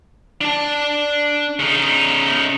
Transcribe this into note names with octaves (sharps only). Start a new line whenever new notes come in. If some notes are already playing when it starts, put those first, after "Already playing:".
D4 A5
C#3 D#4